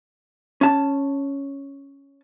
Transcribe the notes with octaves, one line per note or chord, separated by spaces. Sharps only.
C#4 A5